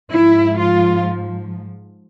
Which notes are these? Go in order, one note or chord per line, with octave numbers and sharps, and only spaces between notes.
G#2 F3 E4
F4